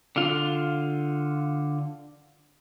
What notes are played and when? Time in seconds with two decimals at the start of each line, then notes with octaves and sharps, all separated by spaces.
0.16 D3 F4